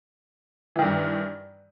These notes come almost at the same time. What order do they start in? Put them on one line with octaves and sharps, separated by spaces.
E3 D#3 G2